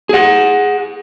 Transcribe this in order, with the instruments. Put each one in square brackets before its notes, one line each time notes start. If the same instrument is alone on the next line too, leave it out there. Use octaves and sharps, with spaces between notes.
[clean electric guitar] G#4 F#5